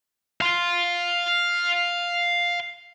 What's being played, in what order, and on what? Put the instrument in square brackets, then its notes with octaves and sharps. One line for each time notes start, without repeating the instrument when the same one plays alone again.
[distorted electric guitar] F5 C6